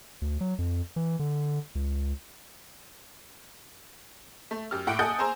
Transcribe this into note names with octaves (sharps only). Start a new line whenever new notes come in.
D2
F#3
F2
E3
D3
C#2
A3
F#2 G4 F6
A2 F#5 G5 D6 D7
A4 D#5 F#5 G#5 D#6 G6
G#4 C5 G#5 A#5 C6 E6